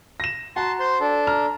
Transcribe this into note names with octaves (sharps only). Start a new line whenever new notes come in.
A#6 E7
F#4 A5 A#5 C6
C5 C6
D4 A4
A#5 F6